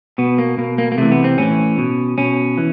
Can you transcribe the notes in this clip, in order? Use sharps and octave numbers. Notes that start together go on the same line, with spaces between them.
B2 B3
A#3
B2 A#3
A#3
A#3
C3 E3 A3
B3
C4
A2 E3 C#4
B2
B2 C#4
E3